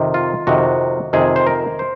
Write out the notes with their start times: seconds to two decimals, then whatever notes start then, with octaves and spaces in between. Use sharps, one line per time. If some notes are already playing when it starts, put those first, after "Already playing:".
Already playing: F2 C3 D#3
0.14 F4
0.47 F2 C3 D#3 F#4
1.13 F2 C3 D#3 G#4
1.36 C5
1.47 A#4
1.79 C5